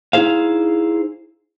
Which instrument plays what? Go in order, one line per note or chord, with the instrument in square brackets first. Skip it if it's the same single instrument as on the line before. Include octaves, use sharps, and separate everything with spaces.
[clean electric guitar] D#4 E4 F#4 G#4 C5 F5